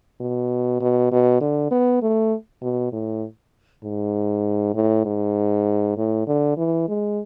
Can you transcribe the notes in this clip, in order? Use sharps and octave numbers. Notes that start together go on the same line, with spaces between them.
B2
B2
B2
D3
B3
A3
B2
A2
G#2
A2
G#2
A2
D3
E3
G#3